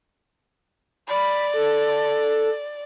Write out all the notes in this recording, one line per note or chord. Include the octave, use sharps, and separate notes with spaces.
D5 B5
A4